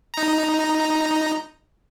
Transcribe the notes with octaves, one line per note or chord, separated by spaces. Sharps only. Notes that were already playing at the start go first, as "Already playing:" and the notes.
D#4 A#5